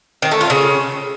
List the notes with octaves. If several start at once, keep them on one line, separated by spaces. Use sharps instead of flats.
D#3
A3
F4
C#3